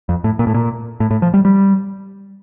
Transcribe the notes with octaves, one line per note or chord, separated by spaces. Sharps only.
F2
A2
A#2
A2
A#2
A2
A2
F3
G3
G3